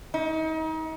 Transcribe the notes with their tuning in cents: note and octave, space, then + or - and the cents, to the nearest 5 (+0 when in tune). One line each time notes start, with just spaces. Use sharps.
D#4 +35